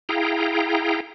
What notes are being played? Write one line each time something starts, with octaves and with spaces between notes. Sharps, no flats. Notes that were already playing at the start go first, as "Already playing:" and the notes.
E4 G#4 F5 G5 A#5